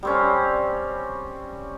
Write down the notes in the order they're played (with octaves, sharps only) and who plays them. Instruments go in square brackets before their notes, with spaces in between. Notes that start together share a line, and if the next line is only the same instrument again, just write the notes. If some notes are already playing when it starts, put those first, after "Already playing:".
[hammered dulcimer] G3 C4 C#4